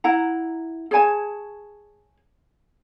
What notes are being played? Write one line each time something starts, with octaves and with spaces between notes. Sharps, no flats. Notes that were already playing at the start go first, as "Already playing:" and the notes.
E4 F#5 A#5
G#4 C#5 G#5 A5